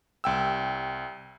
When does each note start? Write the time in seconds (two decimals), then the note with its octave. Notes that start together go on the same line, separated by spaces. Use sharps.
0.24 C2 G5 E6